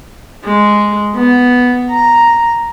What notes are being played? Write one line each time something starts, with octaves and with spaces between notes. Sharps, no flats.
G#3
B3
A#5